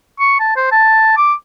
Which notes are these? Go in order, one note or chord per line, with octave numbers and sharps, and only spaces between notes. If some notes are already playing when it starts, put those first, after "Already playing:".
C#6
A5
C5
A5
D6